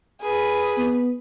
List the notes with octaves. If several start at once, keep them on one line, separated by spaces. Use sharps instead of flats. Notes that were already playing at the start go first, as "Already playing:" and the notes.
G#4 B4
B3